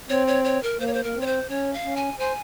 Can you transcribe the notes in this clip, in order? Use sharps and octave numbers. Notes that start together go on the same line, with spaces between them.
C4 C#5
C#5
C#5
A#4
A#3 C5
C#5
C5
A#3 A#4
C4
C#5
C5
C#4 C#5
F5
C#4
G#5
C5 G#5